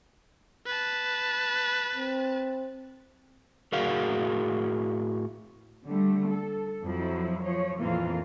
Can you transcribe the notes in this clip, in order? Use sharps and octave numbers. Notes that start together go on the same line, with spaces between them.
B4 A5
C4
A2 F#4 G#4 A#4 F5
D3 G3 A3
A4
F2 F3 F#3 E4
F3 C#5
F2 A#2 E3 A#3 F4